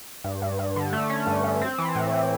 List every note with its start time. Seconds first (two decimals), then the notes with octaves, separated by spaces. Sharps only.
0.24 G2
0.42 G2
0.59 G2
0.76 D3
0.93 A3
1.10 C#4
1.27 G2
1.44 G2
1.61 C4
1.78 E3
1.95 A2
2.12 A2